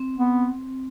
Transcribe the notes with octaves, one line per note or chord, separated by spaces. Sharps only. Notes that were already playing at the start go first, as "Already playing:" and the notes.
Already playing: C4
B3